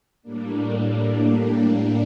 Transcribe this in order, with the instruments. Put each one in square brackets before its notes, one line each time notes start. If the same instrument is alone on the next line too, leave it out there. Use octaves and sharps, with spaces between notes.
[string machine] A2 G3 A#3 D4